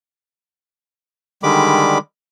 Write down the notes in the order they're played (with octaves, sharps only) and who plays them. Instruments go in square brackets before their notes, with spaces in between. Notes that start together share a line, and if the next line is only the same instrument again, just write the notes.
[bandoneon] D3 D#3 G3 G#3 B5 D6